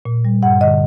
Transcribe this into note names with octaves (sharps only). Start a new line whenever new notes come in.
A#2
G3
G2 F#5
D3 D#5